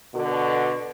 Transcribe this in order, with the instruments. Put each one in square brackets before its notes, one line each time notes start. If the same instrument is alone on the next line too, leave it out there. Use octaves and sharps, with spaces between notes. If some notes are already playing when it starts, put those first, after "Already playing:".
[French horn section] B2 D3 F#4